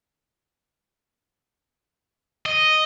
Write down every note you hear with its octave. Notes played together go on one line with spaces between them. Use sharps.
D#5